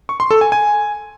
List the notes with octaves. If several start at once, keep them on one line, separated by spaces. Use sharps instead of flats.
C#6
C6
A4
G#5
G#5